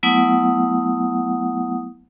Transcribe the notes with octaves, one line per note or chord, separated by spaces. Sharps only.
F#3 A3 B3 E4 F#5 D#6